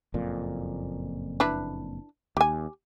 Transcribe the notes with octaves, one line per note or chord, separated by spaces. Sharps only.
F#1 F2 A#2
D4 E4 B4
D#2 G4 G#5